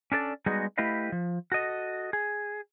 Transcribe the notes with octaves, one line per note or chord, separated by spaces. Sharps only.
C#4 D4 A4 D5
G3 G#3 B3 D#4 F#4 G#4
A3 E4 G4 B4 D#5 F5
F3
F#4 A4 D#5
G#4